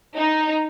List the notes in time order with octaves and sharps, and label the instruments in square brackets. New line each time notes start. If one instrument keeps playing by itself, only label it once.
[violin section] D#4